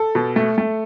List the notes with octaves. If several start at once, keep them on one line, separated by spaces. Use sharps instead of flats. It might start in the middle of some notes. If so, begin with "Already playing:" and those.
Already playing: A4
B2
A3
A3